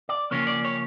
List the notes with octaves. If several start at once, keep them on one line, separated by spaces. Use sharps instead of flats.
D5
C#3 F3 A#3 C#4 C#5
D5
C#5